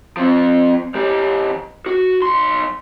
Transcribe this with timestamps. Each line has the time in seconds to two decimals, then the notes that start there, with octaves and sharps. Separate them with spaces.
0.17 F3 C4
0.95 E3 G4
1.86 F#4
2.22 B1 C6